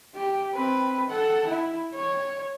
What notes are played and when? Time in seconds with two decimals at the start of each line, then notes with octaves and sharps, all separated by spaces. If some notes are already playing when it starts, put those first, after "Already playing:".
0.15 G4
0.53 C4 B4
1.09 A4 F#5
1.47 E4
1.93 C#5